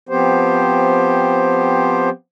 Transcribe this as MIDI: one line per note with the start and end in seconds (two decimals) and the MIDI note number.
0.09 2.09 53
0.09 2.09 59
0.09 2.09 60
0.09 2.09 67
0.09 2.09 72